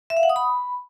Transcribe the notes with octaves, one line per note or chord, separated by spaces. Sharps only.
E5
F5
F#5
D#6
B5